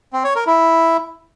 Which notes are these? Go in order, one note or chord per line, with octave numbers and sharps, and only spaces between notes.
C4
C#5
A#4
E4